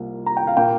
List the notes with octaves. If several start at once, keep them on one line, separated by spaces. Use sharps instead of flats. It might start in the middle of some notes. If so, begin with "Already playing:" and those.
Already playing: C2 F3 A#3
A#5
G5
F5
A#2 A#3 G5